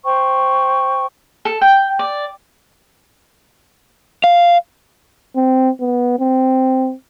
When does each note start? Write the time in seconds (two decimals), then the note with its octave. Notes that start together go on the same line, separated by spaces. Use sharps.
0.04 C5 G5 C#6
1.45 A4
1.61 G5
1.99 D5
4.24 F5
5.36 C4
5.80 B3
6.19 C4